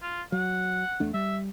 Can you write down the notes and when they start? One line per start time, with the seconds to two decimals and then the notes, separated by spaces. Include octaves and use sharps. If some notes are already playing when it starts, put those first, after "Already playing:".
0.02 F4
0.32 F#3 F#5
1.00 E2 A3 D4
1.14 G3 E5